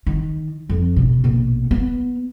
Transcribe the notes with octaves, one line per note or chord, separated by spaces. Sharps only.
D#3
F2
B2
A#1 B2
B3